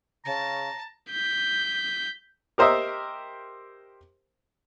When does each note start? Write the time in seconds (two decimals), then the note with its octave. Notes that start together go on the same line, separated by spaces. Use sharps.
0.25 C#3 A5 A#5
1.10 G6 B6
2.58 G4 A#4 C5 D#5 E5